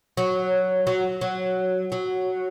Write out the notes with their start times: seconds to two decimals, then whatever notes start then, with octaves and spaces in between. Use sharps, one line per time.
0.17 F#3
0.87 F#3
1.21 F#3
1.92 F#3